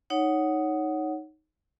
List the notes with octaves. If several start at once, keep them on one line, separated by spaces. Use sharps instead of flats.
D#4 C#5 F#5